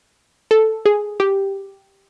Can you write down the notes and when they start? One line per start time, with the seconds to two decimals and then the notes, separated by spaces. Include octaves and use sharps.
0.51 A4
0.86 G#4
1.20 G4